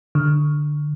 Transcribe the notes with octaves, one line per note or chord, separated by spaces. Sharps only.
D3